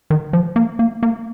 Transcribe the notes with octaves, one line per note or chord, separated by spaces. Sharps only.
D#3
F3
A#3
A#3
A#3